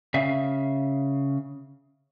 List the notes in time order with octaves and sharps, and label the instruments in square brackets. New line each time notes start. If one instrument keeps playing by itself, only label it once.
[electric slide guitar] C#3 E5 F5